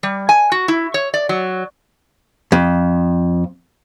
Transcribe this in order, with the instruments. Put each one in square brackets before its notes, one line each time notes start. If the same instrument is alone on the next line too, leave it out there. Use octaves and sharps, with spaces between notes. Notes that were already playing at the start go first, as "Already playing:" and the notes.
[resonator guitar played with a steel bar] G3
G#5
F#4
E4
C#5
D5
F#3
[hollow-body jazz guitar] F2